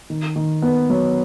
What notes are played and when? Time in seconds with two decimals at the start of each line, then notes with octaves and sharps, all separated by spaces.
0.10 D#3
0.36 D#3
0.62 B3
0.90 F#3